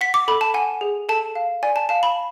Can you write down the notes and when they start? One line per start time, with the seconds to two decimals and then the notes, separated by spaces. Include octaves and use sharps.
0.01 F#5 B6
0.14 D6
0.28 A4 B5
0.41 A5
0.54 F#5 G#5
0.81 G#4
1.09 A4 A5
1.35 F5
1.63 D5 G#5
1.76 A5
1.89 F5 A5
2.03 B5